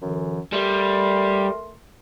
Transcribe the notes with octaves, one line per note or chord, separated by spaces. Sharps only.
F#2 D3 E3
G3 A3 A#4 C6